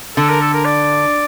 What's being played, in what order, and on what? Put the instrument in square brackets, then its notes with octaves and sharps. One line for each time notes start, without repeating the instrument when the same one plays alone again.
[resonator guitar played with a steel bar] D3 [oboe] A4
[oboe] A#4
A4
A#4
D5